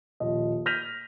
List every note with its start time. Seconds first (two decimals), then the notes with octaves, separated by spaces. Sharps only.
0.20 D#1 F3 D#5
0.66 F6 G6 A#6 B6 D#7 F7